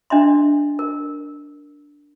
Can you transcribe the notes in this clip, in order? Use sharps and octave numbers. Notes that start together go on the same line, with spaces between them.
D4 D#5 E5 C6
A#4